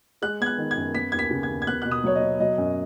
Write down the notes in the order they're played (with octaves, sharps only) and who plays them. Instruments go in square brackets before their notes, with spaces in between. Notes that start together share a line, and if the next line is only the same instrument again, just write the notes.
[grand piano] G#3 F#6
B3 G#6
F#6
D#3
G#6
F#2
B3 B6
D#2 G#6
B6
C#3
G#6
D#2
G#6
B3 F#6
B2 F#6
D#6
F#3 C#5
D#5
B2
F#3 D#5
F#2